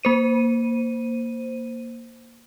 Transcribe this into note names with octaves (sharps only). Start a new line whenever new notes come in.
A#3 C5 D#7